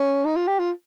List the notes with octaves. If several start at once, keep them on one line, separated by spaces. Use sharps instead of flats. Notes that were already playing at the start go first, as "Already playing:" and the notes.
Already playing: C#4
D#4
F4
G4
F4